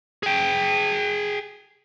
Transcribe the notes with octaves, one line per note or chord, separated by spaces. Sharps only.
G#4 G5